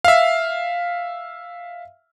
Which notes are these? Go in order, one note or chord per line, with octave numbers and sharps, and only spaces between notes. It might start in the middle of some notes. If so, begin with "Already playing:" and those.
E5 F5